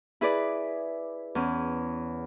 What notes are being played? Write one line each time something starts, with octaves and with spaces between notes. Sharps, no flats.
E4 G#4 B4 D5
E2 C#4